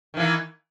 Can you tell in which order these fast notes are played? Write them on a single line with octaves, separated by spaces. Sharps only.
D#3 E3 A#3